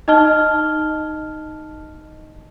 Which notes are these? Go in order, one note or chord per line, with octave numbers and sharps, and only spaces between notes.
D#4 D#5 A5 F6 G7